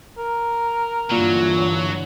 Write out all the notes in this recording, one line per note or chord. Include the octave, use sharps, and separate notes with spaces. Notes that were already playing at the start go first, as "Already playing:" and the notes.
A#4
G2 A#2 D3 E3 F#3